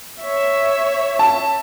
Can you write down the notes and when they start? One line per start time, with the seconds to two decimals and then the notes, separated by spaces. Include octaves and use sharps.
0.21 C#5 E5
1.19 A5